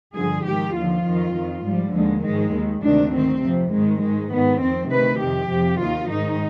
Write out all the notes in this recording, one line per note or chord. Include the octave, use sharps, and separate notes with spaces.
G2 D3 F3 G#4
G#2 D#3 G4
D#2 D3 F3 F4
F2 D#3
F2 D#3
G#2 F3 G3
D#2 D3 F3 G#3
G#2 D#3 G#3
D#2 D#3
D2 C3 D#3 D4
G#2 D#3 C4
F2 C3 F3
G#2 D#3 G#3
G#2 D#3 G#3
G#2 D#3 B3
F2 D#3 C4
D2 C3 D#3 B4
F2 C3 D#3 G4
F2 C3 F3
D#2 D#3 F4
G#2 D#3 D#4